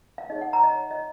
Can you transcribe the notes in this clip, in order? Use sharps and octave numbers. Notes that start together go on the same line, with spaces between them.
F5
D#4 G#4 C#5 D#5
F#5
A#5
D#5
C#5
D#5